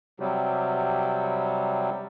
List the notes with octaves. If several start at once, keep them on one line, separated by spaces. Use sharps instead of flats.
C3 F#3 G3